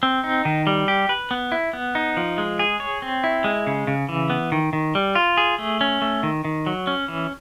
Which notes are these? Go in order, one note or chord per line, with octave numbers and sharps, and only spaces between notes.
C4
D#4
D#3
G3
G4
B4
B3
E4
B3
D#4
F3
G#3
G#4
C#5
C4
E4
G#3
C#3
C#3
E3
B3
D#3
D#3
G3
F4
G#4
A3
C#4
A3
D#3
D#3
F#3
C#4
E3